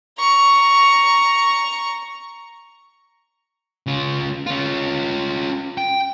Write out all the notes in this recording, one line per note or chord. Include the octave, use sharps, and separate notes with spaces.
A#5 C#6
C#3 F4
C#4 F4
G5